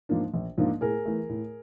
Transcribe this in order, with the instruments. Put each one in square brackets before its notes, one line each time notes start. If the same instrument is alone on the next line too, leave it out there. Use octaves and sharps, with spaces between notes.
[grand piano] G#2 F3 A#3 D4
A#1
G#2 F3 A#3 D4
A2 G#4 A#4
E3 A3
A2